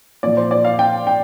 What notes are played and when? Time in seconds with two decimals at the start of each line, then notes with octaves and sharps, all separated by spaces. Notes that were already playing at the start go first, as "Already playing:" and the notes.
0.23 A#2 F3 D5
0.37 C5
0.51 D5
0.65 F5
0.79 G5
1.07 G5